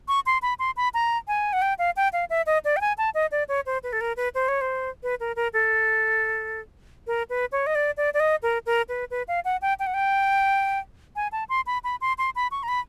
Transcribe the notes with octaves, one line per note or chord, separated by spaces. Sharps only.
C#6
C6
B5
C6
B5
A#5
G#5
F#5
G5
F5
G5
F5
E5
D#5
D5
G5
G#5
A5
D#5
D5
C#5
C5
B4
A4
A#4
B4
C5
C#5
C5
B4
A#4
A#4
A4
A#4
B4
C#5
D#5
D5
D5
D5
D#5
A#4
A#4
B4
B4
F5
F#5
G5
G5
F#5
G5
G#5
A5
C6
B5
B5
C6
C6
B5
C#6
A#5
B5